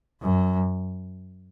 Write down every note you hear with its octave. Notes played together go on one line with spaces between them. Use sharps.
F#2